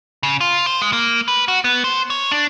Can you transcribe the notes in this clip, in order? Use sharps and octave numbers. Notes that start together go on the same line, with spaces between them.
C#3
F4
C5
G#3
A#3
B4
F#4
B3
C5
C#5
D4